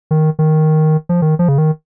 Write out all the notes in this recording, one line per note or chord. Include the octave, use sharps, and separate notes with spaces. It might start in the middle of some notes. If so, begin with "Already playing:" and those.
D#3
D#3
F3
D#3
F3
C#3
D#3